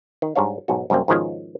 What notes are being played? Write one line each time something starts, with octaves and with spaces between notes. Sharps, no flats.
D#3
G#2 G3 D4 C#5 F5
B1 G#2 F#4
C2 F#2 G3 A#3 C4
G#2 B2 D#3 F3 G#3 C#4